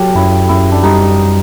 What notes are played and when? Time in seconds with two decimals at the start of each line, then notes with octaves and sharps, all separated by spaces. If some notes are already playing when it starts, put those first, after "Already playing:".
Already playing: F#3 G4 A4
0.15 F#2 E4
0.49 F#2 E4
0.72 D4
0.83 G3 D#4